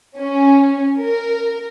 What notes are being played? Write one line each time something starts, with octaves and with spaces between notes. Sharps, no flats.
C#4
A#4